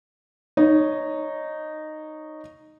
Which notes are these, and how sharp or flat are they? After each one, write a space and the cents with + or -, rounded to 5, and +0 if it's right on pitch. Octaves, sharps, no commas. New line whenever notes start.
D#4 -10 C#5 +0